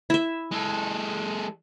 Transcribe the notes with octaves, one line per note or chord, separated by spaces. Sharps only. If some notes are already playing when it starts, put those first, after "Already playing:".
E4 E5
G#3 A4